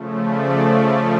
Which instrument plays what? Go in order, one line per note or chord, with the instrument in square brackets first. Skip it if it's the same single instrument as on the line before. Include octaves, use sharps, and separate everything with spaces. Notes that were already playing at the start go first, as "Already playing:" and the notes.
Already playing: [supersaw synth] C#3 F3 A3
D5